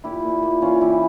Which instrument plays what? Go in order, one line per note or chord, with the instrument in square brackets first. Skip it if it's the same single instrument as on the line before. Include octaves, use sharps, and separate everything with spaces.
[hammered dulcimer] A#2 E4 G4
A#2
A#2
E3 C#4 F4
E3 E4 G4